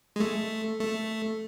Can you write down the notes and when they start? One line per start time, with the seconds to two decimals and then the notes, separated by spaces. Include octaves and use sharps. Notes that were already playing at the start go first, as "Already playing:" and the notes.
0.16 G#3
0.20 A3
0.80 A3